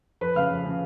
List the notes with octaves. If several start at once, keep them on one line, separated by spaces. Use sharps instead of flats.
F2 B4 B5
C#3 F5 F6
F2
C#3